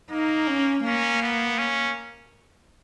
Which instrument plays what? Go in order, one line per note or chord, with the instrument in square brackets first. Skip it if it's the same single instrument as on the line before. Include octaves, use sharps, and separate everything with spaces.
[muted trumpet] A#3 [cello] D#4
[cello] C#4
[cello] A#3 [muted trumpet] C#4
[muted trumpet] B3
C#4